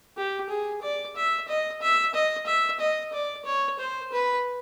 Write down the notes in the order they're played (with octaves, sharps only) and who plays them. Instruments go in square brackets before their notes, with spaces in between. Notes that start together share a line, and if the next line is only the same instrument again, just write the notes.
[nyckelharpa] G4
G#4
D5
E5
D#5
E5
D#5
E5
D#5
D5
C#5
C5
B4